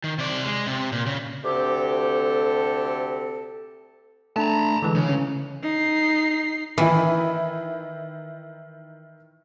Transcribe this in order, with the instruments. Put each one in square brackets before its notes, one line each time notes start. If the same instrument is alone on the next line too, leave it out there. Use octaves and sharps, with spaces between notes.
[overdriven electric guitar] D#3
C3 D5
G#3
C3
A#2
C#3
[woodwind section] D2 C3 C4 G4 A4
[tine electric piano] A3 D4 [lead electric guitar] A5 A#5
[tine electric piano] D3 E3 G#3
[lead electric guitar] C#3
[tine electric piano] C#4
[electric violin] D#4 C7
[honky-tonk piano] D#3 E4 [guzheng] E3